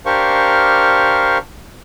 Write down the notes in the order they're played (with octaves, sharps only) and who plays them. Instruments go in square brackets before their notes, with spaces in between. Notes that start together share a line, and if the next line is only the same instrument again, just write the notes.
[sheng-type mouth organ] D4 G4 A#4 C5 F5 C#6